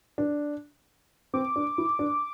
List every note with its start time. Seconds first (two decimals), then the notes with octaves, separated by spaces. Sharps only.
0.18 D4
1.34 C4 D6
1.56 D4
1.78 E4
1.99 D4